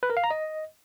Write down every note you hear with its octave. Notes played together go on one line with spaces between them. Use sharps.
B4
A#4
F5
A#5
D#5